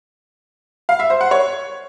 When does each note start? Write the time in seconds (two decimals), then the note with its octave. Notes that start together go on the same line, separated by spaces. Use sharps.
0.89 F5
0.99 E5
1.10 C5
1.21 F#5
1.31 C#5